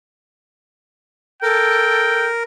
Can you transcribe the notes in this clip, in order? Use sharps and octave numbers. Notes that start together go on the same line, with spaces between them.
A4 A#4 G5